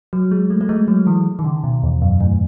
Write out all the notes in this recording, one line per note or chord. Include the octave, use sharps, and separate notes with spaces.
F#3
G#3
A3
A3
G#3
F#3
E3
D#3
C#3
B2
E2
F#2
A2